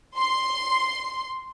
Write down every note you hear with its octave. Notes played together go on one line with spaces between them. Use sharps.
C6